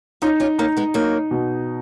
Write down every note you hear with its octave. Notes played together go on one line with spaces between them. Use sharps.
C#4 D#4 F4
C#4 F4
A#3 C#4 D#4
G#3 B3
F#3 A#3 D#4
B2